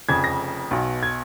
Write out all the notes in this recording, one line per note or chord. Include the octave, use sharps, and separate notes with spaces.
F1 F2 C#3 G#6
A#6
B1 B2
G#6